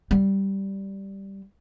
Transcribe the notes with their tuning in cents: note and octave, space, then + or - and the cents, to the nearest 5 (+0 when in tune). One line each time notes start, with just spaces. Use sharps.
G3 -5